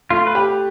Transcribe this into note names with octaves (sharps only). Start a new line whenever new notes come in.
A3 F4
B4
G4